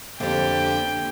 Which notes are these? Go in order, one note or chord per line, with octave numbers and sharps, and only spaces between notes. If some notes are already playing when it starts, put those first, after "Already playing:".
F2 D3 A#3 G4 G5